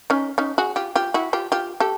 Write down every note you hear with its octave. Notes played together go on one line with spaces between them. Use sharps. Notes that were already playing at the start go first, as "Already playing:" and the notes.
C#4 D#4
C#4 D#4
F#4 G#4
F4 G4
F4 G4
E4 F#4
F4 G4
F4 G4
G4 A4